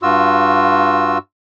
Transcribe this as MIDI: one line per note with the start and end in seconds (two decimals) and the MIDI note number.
0.03 1.18 43
0.03 1.18 65
0.03 1.18 66
0.03 1.18 88